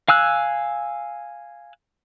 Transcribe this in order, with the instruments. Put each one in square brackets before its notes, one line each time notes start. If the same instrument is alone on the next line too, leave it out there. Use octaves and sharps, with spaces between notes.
[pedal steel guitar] F5 G#5 E6 F#6